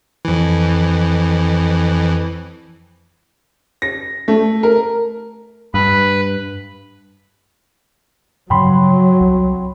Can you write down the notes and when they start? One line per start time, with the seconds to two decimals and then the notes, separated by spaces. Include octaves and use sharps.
0.25 F2 E3
3.82 A#6
4.28 A3
4.63 A#4
5.74 G2 B4
8.50 G2 C#3 F3 F#3 G5 B5 C6
9.20 C2